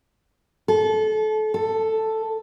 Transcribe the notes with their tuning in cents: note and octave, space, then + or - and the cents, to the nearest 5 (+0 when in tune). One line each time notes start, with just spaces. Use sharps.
A4 -30
A4 +5